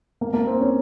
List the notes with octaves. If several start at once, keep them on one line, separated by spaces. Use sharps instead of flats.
A#3
A#3
C4
C#4